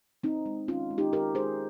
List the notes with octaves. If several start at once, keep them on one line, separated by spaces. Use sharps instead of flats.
D#3 C4 D#4
G#3
D#3 C#4 F4
G#3
D#4 G4
D#3 G4 A#4
G#3 G#4 C5